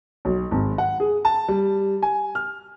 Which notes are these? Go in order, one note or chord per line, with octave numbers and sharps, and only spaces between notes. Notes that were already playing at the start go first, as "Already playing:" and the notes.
B1
G#1
F#5
G#4
A5
G3
G#5
F6